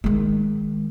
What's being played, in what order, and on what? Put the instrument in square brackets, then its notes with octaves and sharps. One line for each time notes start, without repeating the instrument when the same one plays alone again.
[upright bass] D#3 G#3